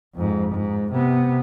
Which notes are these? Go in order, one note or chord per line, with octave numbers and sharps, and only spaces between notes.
F2 G#2
G#2
C3 B3